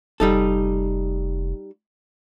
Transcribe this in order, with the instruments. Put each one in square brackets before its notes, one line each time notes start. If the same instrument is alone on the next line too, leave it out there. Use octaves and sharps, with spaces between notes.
[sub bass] F1 [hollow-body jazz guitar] G3 D#4 A4